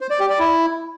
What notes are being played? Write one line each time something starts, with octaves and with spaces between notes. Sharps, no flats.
C5
D5
G4
D5
E4